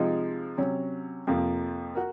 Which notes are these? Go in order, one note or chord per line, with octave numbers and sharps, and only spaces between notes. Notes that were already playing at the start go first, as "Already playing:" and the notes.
Already playing: C3 F3 G#3 D#4
C3 F#3 C#4
F2 C3 F3 A#3
F#4 A#4